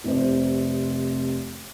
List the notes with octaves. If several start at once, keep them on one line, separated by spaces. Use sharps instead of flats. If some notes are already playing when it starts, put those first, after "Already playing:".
F1 C3 C5